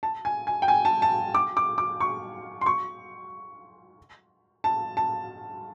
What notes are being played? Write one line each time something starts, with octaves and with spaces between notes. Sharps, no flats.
A5
G#5
G#5
G5
G#5
A5
A5
D6
D6
D6
C#6
C6
C#6
A5
A5